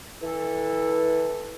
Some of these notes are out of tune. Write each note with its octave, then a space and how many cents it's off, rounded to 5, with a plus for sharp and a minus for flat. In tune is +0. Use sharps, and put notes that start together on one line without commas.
E3 -20 A4 +0